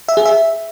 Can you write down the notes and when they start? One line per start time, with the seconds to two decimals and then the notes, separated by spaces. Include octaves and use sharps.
0.08 E5
0.17 G#4
0.25 E5